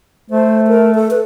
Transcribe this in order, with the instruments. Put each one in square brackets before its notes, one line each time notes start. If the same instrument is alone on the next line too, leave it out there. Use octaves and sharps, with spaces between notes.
[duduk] A3 [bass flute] C5
[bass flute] A#4
A4
B4